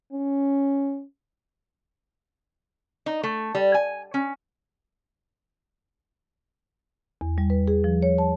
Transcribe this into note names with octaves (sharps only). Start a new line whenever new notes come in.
C#4
D#4
A3
G3
G#5
C#4
E2
G3
B4
G#4
F3
C#5
A5